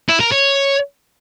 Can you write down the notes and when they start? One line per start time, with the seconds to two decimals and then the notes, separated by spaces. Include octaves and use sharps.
0.09 E4
0.20 A#4
0.32 C#5